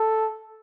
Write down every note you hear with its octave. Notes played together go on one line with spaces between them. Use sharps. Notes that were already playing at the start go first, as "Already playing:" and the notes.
Already playing: A4